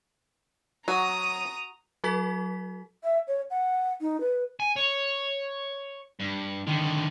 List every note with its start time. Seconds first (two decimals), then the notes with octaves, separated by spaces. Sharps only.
0.88 F#3 F#4 A#5 D#6
2.04 F#3 F#4 A4 B6
3.04 E5
3.28 C#5
3.51 F#5
4.01 D#4
4.21 B4
4.60 G#5
4.76 C#5
6.20 G2
6.67 D3 D#3